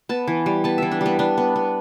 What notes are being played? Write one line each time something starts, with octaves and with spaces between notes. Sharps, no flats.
B3 A5
E3
G3
B3 A5
E3 E5
D4
G3 B3
B3 D4
B3
B3